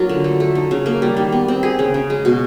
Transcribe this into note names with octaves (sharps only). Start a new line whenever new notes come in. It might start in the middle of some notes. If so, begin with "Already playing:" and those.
Already playing: F#3 A#3 D4 F4 A#4
D3
A3
A3
D#4
C#3
A#3
G3
D#3
B3
C4
G#4
C#3
C#3
G#3
B2